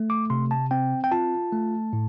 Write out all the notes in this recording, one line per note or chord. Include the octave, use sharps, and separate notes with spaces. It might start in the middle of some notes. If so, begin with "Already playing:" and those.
Already playing: A3
D6
C3 C6
A5
C4 G5
G5
F4 A5
A3
A2